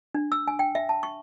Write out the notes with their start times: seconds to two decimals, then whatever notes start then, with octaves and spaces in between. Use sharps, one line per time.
0.15 D4
0.32 E6
0.48 G#5
0.59 G5
0.75 E5
0.89 A5
1.03 C#6